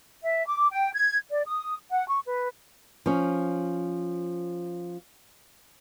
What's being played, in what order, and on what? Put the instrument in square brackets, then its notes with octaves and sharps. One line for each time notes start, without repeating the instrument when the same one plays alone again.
[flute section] E5
D6
G5
G#6
D5
D#6
F#5
C#6
B4
[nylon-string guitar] F3 C#4